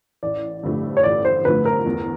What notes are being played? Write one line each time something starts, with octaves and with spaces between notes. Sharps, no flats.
A1 D5
G2 D3 F3 A3
C#5
A1 D5
C5
G2 D3 F3 A3 B4
A#4
E2